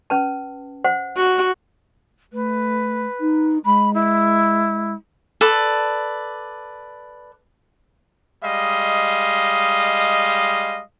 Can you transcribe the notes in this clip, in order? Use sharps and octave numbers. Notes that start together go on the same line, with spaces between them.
C#4 B4 A5
C5 F#5
F#4
A3 B4
D#4
G#3 B5
E4
A4 B4 D5
G3 G#3 D#5 F5